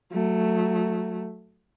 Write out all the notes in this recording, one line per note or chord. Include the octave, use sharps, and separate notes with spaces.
F#3 A3